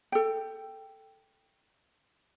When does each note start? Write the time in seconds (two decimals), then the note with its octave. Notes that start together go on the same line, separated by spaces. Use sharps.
0.12 A4 G5